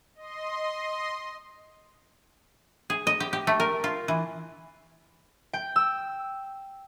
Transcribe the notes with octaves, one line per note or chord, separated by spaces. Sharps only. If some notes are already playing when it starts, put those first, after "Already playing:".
D#5 C6
G#4
D#5
G4
G4
A3
A#4
F4
E3
G5
E6